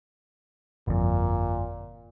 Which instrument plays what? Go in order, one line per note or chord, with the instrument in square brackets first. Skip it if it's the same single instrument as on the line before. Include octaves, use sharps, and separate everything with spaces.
[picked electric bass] G1 F2 [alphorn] A#2